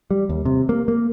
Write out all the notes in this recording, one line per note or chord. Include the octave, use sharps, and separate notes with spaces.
G3
D#2
C3
A#3
A#3